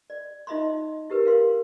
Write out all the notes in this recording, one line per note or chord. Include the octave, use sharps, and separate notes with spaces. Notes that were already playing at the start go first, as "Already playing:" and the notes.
D5
D#4 F4 D#5 E5 B5 C6
E4 G4 A#4 B4
A#4 F5 C6